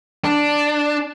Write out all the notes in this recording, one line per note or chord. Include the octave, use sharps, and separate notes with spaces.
D4